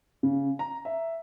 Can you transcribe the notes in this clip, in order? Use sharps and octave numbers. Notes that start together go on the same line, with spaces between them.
C#3
A#5
E5